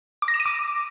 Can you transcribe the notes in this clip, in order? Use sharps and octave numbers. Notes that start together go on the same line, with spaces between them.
D6
A#6
E7
D#7
D6